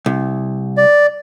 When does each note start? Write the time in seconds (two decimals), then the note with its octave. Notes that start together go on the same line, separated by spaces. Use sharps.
0.06 C2
0.77 D5